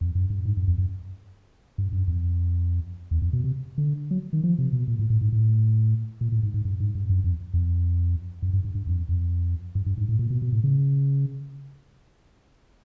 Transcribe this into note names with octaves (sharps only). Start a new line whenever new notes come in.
F2
F#2
G2
G#2
F#2
F2
F#2
G2
F#2
F2
E2
F2
B2
C3
D3
F#3
D#3
F3
C3
B2
A#2
A2
A2
G#2
A2
A#2
A2
G#2
G#2
G2
G#2
G2
F#2
F2
F2
F#2
G2
G2
G2
F2
F2
G2
G2
G#2
A2
A#2
B2
B2
A2
C#3